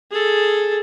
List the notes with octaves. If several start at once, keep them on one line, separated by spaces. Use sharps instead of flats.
G#4 A4